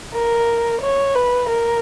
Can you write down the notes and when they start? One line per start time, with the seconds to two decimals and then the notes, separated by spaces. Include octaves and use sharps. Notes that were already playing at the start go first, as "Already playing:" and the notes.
0.14 A#4
0.81 C#5
1.15 B4
1.49 A#4